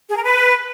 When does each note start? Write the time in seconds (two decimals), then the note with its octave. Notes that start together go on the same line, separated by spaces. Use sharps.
0.09 G#4
0.16 A#4
0.23 B4